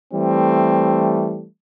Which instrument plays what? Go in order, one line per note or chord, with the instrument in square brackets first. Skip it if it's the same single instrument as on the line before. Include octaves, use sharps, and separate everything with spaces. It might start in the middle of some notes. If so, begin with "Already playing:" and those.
[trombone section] E3 G3 A3 C4